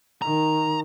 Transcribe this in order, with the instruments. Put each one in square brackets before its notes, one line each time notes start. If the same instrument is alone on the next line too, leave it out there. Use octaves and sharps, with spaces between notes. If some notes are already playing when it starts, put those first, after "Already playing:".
[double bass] D#3 [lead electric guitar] A#5